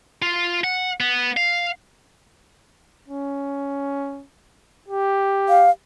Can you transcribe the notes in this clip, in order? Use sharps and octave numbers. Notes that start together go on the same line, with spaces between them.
F4
F#5
B3
F5
C#4
G4
F5